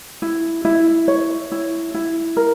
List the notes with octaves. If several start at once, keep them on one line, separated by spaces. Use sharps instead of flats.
E4
E4
C#5
E4
E4
A#4